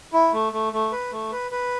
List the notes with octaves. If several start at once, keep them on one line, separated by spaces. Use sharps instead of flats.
E4
A3
A3
A3
B4
A3
B4
B4